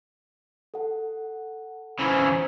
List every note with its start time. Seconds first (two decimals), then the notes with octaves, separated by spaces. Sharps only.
0.74 A4 F#5
1.99 C#3 E3 C5 A#5 G#6